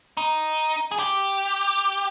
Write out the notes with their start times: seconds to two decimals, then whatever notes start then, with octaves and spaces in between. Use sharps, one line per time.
0.17 D#4
0.92 G#4
0.99 G4